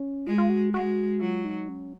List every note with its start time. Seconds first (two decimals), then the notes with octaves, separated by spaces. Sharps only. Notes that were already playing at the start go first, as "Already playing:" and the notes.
Already playing: C#4
0.26 G#3 F4
0.38 F4
0.50 F#4
0.74 G#3 F#4
1.20 F#3 F4
1.45 D#4
1.69 C#4